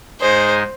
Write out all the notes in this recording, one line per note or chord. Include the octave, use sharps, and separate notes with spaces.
G#2 G#3 D#4 G#4 C5